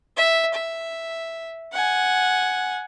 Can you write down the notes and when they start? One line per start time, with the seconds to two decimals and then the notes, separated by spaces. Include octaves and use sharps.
0.17 E5
0.54 E5
1.73 F#5 G#5